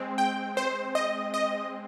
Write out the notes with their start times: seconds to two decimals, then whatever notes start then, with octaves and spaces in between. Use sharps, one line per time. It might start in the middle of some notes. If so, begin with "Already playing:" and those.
Already playing: G#3 C4
0.18 G5
0.57 C5
0.95 D#5
1.34 D#5